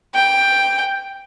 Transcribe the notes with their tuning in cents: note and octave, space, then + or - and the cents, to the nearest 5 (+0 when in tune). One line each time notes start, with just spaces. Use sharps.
G5 +5